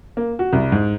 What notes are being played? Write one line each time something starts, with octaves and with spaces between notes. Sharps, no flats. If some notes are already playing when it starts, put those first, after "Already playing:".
A#3
F#4
C2
G#2